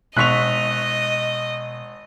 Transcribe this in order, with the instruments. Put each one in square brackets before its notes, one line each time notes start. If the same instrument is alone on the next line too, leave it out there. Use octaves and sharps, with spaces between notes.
[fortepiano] G#1 C#6 [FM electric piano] B2 [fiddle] D#5 [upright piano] F#6 B6 F7